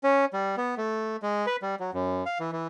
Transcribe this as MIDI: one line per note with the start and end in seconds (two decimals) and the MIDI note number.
0.04 0.25 61
0.33 0.56 55
0.57 0.75 59
0.78 1.17 57
1.22 1.46 56
1.47 1.56 71
1.62 1.75 55
1.80 1.91 54
1.94 2.24 42
2.26 2.38 77
2.40 2.51 52
2.52 2.67 52